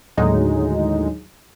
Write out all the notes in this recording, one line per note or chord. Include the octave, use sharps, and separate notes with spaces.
D#2 A2 D3 F#3 G#3 D#4